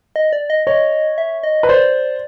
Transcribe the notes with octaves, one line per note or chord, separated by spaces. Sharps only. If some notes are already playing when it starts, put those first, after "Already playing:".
D#5
D5
D#5
C#5 D#5
E5
D#5
B4
C5 D5